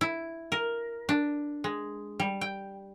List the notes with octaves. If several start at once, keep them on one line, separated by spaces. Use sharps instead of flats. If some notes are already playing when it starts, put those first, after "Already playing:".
E4
A#4
D4
G#3
G3
G5